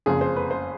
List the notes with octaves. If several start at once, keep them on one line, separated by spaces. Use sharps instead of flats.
F#1 F2 C#3 F3 G#4
C5
B4
C5